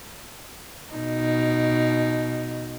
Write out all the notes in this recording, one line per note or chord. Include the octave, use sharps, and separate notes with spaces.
B2 D#4